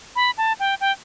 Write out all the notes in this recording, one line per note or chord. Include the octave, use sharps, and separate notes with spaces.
B5
A5
G5
G5